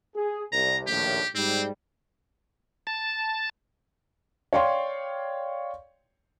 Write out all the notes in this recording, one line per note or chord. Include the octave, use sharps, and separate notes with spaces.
G#4
C2 A#5
A#1 D#2 A2 G4
G#2 G3 C4
A5
C#5 D5 F5 G5 C6 C#6